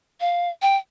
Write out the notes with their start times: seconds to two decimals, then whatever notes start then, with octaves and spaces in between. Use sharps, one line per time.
0.20 F5
0.62 G5